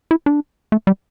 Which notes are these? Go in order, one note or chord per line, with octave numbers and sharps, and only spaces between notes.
E4
D4
A3
G3